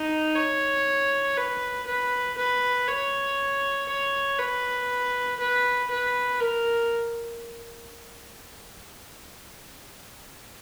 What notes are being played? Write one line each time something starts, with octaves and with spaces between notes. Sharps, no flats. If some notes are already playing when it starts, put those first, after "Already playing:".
Already playing: D#4
C#5
B4
B4
B4
C#5
C#5
B4
B4
B4
A#4